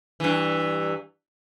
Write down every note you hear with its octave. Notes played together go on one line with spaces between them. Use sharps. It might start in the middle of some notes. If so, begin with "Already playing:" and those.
G2 E3